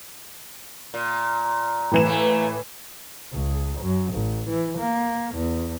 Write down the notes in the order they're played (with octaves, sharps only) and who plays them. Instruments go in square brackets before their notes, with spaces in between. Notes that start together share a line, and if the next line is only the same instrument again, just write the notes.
[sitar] A#2
[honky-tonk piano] A2 E3 E7
[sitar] A3 A#3
[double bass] C#2
F#2
A1
E3
A#3
E2